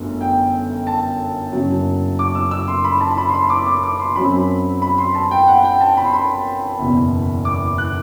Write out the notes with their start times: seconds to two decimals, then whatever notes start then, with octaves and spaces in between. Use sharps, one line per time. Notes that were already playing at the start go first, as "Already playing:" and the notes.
Already playing: G1 F#2 F#3 A3
0.21 G5
0.87 A5
1.53 F#1 F#2 F#3
2.19 D6
2.35 E6
2.51 E6
2.68 C6
2.84 B5
3.00 A5
3.18 B5
3.29 C6
3.34 B5
3.50 D6
3.66 D6
3.83 D6
4.00 C6
4.16 F#2 F#3 C4 B5
4.82 B5
4.98 C6
5.15 A5
5.31 G5
5.48 F#5
5.64 G5
5.81 A5
5.97 B5
6.05 C6
6.13 B5
6.79 F#1 E2 B2
7.45 D6
7.78 F#6